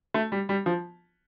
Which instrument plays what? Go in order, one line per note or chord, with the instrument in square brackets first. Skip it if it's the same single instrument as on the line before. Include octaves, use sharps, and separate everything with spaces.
[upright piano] A3
G3
G3
F3